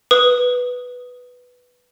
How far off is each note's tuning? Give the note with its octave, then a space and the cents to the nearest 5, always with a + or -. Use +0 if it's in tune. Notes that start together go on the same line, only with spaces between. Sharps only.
B4 +0 D#6 +0